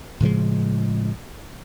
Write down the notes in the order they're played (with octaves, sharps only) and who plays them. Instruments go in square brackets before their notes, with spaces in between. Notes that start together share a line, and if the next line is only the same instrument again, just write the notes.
[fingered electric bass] A2 C#3 F3 G#3